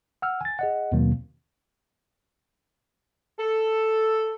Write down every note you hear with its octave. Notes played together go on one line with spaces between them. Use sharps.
F#5 E6 F6
G#5 A6
G#4 D#5 F#5
D#2 B2 D#3 F#3 A#3 C4
A4